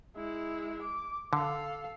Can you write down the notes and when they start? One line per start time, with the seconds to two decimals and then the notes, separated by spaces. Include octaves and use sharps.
0.16 G#3 E4
0.82 D6
1.33 D3 A4 F5